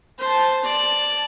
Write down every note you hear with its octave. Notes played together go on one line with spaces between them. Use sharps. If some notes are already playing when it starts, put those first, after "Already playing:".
C5 A5
D5 A5